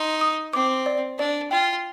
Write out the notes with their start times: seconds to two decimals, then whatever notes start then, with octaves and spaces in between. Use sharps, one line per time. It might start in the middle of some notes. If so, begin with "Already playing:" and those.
Already playing: D#4 C6
0.21 D#6
0.53 C4 D6
0.86 D5
1.19 D4 D5
1.51 F4 G5